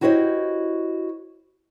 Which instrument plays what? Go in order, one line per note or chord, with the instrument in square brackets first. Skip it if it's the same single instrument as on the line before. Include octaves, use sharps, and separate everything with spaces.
[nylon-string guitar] E4 F#4 G4 C5 C#5 D#5